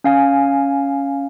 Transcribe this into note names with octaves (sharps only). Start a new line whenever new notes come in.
C#4 F5 G#5